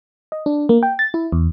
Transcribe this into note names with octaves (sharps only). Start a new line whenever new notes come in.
D#5
D4
A#3
G5
A6
E4
E2